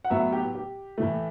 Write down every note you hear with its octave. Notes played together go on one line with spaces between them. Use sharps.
F#5
A2 F#3 B3 E5
G4
G4
A2 E3 A3